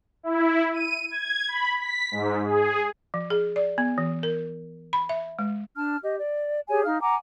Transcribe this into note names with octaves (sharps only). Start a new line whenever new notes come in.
E4
D#7
G#6
B5
B6
G#2
G#4
F3
G#4
D5
B3
E3
A#4
B5
E5
G#3
D4 A5 F6
G4 D#5
D5
G4 G#4 C#5 G#5
D#4 F5 F6
F#5 G#5 A#5 D6